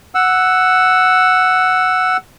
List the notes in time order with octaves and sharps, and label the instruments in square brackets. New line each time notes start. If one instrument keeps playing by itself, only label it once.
[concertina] F#5 E6